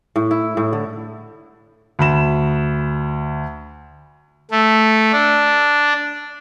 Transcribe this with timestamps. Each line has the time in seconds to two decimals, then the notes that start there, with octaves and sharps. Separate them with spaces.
0.16 A2
0.31 E4
0.57 A2
0.73 D3
1.99 D2 B5 E7
4.51 A3
5.13 D4